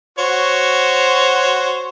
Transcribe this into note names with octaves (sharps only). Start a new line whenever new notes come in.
F#4 C5 C#5